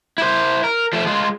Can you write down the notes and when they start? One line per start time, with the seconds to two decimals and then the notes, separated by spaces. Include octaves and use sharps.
0.18 E4 C5
0.64 A#4
0.93 F3 A3
1.06 G#3 F4